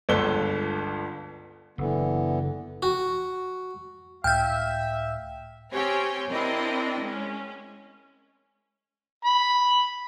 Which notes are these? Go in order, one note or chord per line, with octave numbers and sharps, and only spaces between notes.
G1 C#2 D3 A4 A5 G7
F#1 D3 E3 B3
F#4
C#2 A2 E5 F5 G5 F6 G6
C4 C#4 G4 C#5 G5 G#5
C4 D4 E4 A#4 D#5 G5
G#3 C#4
B5